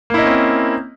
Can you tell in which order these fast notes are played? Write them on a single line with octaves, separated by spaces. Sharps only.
A#3 E4 D#5 C#4 C4